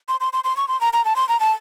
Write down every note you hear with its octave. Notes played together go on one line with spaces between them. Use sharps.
C6
C6
C6
C6
C#6
C6
A#5
A#5
A5
C6
A#5
A5